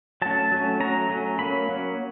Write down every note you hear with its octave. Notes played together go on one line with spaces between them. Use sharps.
F#3 A3 C#4 A5
F#3 A3 C#4
F#3 A3 C#4 A#5
F#3 A3 C#4
F#3 A#3 C#4 B5
F#3 A#3 C#4